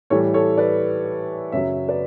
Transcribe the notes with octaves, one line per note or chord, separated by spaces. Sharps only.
A2 E3 G3 A4 C#5
A4 C#5
B4 D5
F#2 C#3 F#3 C#5 E5
B4 D5